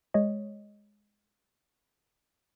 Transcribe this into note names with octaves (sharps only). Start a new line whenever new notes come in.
G#3 C#5 D#5